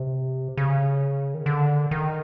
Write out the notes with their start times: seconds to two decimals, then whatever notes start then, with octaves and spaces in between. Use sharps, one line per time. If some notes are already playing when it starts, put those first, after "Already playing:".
Already playing: C3
0.57 C#3
1.34 D#3
1.46 D3
1.91 D#3